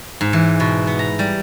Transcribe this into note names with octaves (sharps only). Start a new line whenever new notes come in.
G#2
E3
B2
B3
A#5
G3